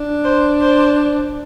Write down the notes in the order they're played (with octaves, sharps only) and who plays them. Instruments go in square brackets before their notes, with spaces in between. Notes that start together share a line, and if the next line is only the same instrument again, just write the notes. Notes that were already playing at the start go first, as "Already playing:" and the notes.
Already playing: [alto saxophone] D4
[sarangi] C5
C5